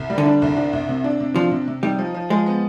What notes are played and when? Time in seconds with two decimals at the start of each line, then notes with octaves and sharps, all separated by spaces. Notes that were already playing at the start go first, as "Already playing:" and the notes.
Already playing: C2
0.10 G3
0.18 D3
0.26 D4
0.42 C2
0.57 D4
0.73 C2
0.89 C3
1.04 D4
1.20 C3
1.36 F3 D4
1.51 C3
1.68 C3
1.83 G3 D#4
1.99 F3
2.14 F3
2.30 F3 G#3
2.46 B3